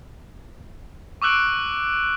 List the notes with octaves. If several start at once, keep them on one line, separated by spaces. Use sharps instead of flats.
C#6 D6 E6 F#6 D7